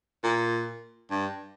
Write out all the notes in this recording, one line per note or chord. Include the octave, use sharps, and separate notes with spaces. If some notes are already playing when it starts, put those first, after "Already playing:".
A#2
G2